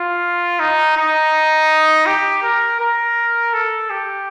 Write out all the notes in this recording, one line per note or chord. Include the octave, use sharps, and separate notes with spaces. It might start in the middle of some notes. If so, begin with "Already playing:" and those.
Already playing: F4
D#4
D#4
G4
A#4
A#4
A4
G4